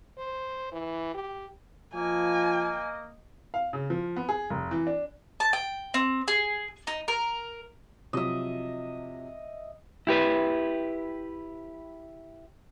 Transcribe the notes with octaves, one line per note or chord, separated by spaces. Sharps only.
C5
E3
G4
F3 A#3 D#5 G#5
F5
C#3
F3
B3
G#4
F1
E3
D4
A5
G5
C4
G#4
D#4
A#4
C3 F3 F#3 D#5 E5
E4 G4 B4